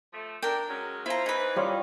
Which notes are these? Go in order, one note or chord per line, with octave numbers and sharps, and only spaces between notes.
F3 A3
D4 A#4 G5
F#3 G#3 C#4
E4 F4 C5 A#5
E3 D#4 G#4 B4 B5
G2 D#3 G3 C#4 F4 C#5